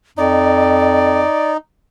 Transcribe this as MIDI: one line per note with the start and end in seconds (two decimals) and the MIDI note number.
0.18 1.22 41
0.18 1.57 63
0.18 1.53 74